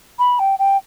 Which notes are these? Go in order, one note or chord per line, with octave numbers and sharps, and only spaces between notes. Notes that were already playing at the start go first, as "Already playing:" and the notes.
B5
G5
G5